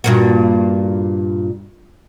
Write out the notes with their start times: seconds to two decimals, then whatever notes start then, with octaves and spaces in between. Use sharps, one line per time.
0.04 G2 A#2 F#4